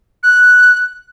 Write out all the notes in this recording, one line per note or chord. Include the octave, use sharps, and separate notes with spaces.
F#6